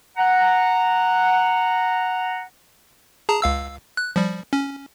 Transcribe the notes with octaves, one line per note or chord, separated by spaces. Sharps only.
F#5 A#5
G#4 A5 A#5
C#2 F5 E6
F#6
F3 G3
C#4